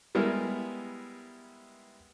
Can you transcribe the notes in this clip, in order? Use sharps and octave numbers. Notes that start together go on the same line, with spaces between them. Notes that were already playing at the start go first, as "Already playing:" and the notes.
G3 G#3 B3 E4 A#4